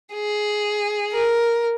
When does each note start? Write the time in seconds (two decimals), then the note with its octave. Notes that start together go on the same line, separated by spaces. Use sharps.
0.14 G#4
1.13 A#4